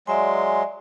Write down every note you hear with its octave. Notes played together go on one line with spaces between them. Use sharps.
F#3 G#3 D5 E5 G#5 C6